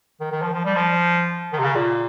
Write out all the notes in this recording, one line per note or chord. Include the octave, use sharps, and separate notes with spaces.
D#3
D#3
F3
F3
G3
F3
D#3
C3
C#3
A#2